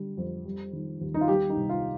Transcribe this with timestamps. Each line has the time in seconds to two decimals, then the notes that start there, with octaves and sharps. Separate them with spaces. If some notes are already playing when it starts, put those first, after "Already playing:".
Already playing: D3 G3
0.17 F2
0.45 G3
0.73 D#3
1.01 D#2
1.14 D#4
1.21 F4
1.28 G3 G4
1.50 D#4
1.56 C2
1.69 F4